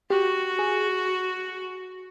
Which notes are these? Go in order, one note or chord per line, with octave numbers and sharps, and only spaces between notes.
F#4 G4
G#4